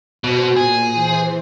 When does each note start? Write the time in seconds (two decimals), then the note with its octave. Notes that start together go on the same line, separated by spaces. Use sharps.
0.24 B2 F#4 C5
0.57 A#2 G#4
0.93 E3 C5